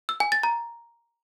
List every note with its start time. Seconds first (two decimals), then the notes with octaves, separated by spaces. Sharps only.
0.09 E6
0.20 G#5
0.32 A6
0.43 A#5